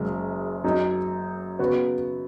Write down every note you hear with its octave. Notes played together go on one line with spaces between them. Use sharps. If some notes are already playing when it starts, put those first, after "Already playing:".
Already playing: F#1 F#2 C#3 G#3
F#2 F#3 D#4
C#3 B3 F#4